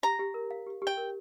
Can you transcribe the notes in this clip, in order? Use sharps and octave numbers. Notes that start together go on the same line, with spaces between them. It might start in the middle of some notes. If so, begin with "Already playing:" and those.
G4 A#5
G4
A#4
F5
G4
G4
G5
A#4